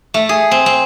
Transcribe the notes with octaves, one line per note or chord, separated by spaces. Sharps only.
A3
G#4
C4
C4